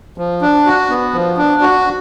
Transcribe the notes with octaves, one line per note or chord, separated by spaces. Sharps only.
F3
D4
F#4
B3
F3
D4
F#4